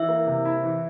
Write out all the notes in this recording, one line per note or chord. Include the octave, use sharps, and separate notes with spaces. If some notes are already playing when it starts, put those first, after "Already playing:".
Already playing: E3 E5
A#3
C3
E4
E3